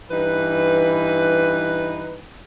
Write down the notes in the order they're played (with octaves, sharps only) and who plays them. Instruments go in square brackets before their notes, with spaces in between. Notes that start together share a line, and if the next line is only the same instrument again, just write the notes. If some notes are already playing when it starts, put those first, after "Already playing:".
[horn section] G2 E3 D#4 B4